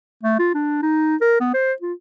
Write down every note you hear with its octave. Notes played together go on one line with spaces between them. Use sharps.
A3
F4
D4
D#4
A#4
B3
C5
F4